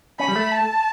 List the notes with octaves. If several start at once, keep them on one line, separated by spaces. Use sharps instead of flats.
C#4 B5
G3
A3
A5